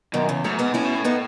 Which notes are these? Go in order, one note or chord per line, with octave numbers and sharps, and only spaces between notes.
F#2 B2 D#3
E2 C#3
G#2 F#3 A3
G#3 B3
A2 C#4 E4
B2
A2
B3 D#4